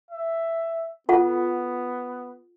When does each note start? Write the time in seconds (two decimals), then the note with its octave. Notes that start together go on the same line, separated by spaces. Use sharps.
0.11 E5
1.09 B3 F4 A4 F#5